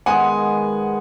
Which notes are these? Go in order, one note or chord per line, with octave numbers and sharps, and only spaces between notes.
D#3 G#3 B3 F#5 G#5